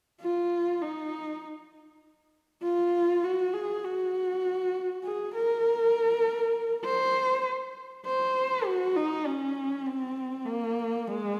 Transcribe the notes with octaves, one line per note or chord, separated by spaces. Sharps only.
F4
D#4
F4
F#4
G#4
F#4
G#4
A#4
C5
C5
F#4
D#4
C#4
C4
A#3
G#3